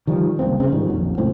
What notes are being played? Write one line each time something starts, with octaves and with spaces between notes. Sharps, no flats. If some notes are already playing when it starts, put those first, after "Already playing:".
D#3 F3 G3
F#1 C2 A#3 C4
F#1 C#3 C4
G#2 D#3 F3 G3
A#1 F2 F#3
F1 C#2 A2 C4